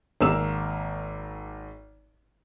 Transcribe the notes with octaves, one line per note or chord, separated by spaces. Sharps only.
G#1 A#3 E6 E7